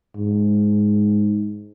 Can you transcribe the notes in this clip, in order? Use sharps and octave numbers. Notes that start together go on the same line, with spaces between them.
G#2